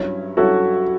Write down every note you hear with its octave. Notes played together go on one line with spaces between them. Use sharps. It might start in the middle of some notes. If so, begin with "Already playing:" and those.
Already playing: G2 F#3 C#4 E4
G2 F#3 C#4 E4 F#4 A4